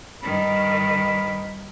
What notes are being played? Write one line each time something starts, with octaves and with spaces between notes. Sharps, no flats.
G2 D#3 B5